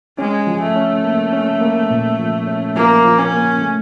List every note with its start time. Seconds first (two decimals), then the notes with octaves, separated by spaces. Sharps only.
0.18 G#3 C#4
0.47 F3
0.62 A3
0.76 C#4
1.04 A#3
1.33 C#4
1.61 A#3
1.90 A#2
2.19 F3
2.47 C#4
2.76 F3 A#3
3.04 F3
3.18 C#4
3.34 A#3
3.62 A3